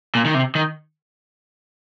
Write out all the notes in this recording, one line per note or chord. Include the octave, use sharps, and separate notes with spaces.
A#2
D#3
C3
D#3